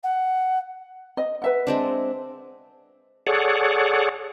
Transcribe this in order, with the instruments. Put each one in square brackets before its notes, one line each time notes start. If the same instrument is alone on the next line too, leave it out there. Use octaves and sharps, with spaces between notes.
[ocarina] F#5
[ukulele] D#5
B4 E5 F#5
[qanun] G#3 C4 D4
[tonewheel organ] G#4 A4 C#5 D5 F#5